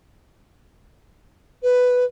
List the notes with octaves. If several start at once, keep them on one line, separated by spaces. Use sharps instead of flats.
B4